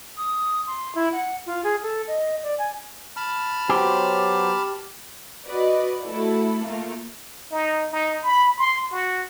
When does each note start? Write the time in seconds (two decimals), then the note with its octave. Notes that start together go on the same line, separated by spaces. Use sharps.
0.17 D#6
0.67 C6
0.95 E4
1.12 F#5
1.46 F4
1.64 G#4
1.83 A4
2.07 D#5
2.43 D5
2.58 G#5
3.17 A5 B5 F6
3.69 F#3 B3 G4 C5
5.46 F#4 B4 D5 D#5
6.05 A3 E4 F#4 A4
6.62 A3 A#3 F4
7.51 D#4
7.92 D#4
8.23 B5
8.58 C6
8.92 F#4